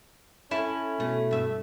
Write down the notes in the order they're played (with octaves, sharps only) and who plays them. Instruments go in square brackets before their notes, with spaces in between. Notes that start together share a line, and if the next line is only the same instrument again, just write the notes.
[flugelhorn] C#4 [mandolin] E4 [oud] A4
[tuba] B2 [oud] A3
[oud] G2 E5 [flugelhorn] A3